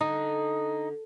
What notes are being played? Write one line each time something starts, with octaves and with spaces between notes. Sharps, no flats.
D3 D#4